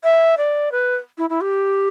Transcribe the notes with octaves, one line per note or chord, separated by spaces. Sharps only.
E5
D5
B4
E4
E4
G4